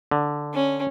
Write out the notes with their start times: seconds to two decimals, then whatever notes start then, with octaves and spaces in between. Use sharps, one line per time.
0.11 D3
0.54 C#4